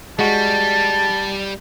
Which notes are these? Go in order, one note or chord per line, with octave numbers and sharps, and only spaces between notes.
G3 G#3 F#4 A5